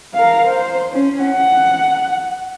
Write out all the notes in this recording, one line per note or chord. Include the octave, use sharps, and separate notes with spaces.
A#4 F5
C5
C#4
F#5